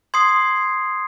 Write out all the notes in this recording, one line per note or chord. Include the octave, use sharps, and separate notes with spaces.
C6 D#6 G#6 C7